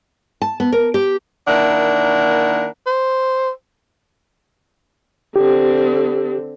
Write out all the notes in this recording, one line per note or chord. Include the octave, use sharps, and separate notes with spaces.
A5
B3
A#4
G4
D#3 A#3 D4 E4 A#4 F#5
C5
D3 C4 G4